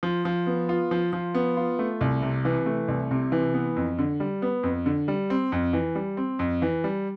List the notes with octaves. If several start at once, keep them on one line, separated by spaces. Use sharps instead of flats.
F3
F3
B3
F4
F3
F3
B3
F4
A3
C2
C3
E3
A3
C2
C3
E3
B3
F2
D3
G3
B3
F2
D3
G3
C4
F2
E3
G3
C4
F2
E3
G3